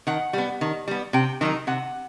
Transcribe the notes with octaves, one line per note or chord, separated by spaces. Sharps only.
D#3 F#5
G3 B3
D#3
G3 B3
C3 G5
D#3 F#3 D#4
C3 F#5